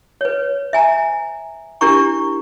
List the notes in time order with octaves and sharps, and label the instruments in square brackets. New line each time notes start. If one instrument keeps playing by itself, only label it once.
[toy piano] B4 C#5
E5 G#5 A#5
D4 E4 G4 A#4 A#5 C#6